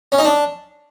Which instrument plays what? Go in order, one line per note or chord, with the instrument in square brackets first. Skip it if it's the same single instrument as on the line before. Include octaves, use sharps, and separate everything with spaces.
[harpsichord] C#4
D#4
D4